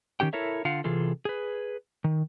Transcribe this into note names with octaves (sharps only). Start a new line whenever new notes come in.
D#3 C#4 G4 G5
E4 A4 A#4 C#5 E5
D3 F4 F5 F#5
C3 E3 F4 G#4 A4
G#4 B4
D#3